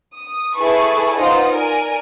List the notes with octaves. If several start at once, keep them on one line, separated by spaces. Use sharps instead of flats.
D#6
E4 G#4 A4 B4 A5 C#6
B3 D#4 F4 C5 D#5 F#5
A#4 D5 G#5